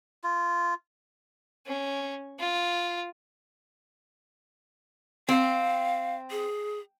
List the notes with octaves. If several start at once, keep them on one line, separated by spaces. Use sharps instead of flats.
F4
C#4
F4
C4 F5
G#4